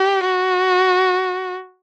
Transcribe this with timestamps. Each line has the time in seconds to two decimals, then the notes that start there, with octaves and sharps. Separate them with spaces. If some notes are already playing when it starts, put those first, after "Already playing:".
Already playing: G4
0.25 F#4